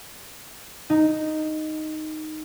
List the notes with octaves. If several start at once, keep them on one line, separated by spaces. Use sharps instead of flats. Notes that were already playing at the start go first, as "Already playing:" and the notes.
D#4